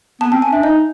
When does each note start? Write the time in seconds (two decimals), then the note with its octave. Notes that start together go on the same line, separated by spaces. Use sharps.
0.21 B3 A5
0.32 C4 A5
0.42 G#5
0.53 D4 E5
0.63 D#4 D#5